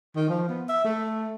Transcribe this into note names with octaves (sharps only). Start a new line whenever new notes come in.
D#3
F3
B3
E5
A3